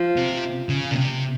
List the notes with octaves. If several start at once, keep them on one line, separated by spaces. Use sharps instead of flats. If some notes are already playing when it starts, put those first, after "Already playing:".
Already playing: F3
C3
C#3
A#2
C3